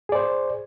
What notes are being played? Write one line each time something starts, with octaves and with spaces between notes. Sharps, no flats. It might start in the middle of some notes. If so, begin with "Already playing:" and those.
G#4 C5 D5